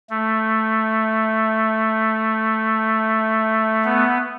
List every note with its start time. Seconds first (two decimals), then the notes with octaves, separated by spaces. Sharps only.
0.10 A3
3.85 B3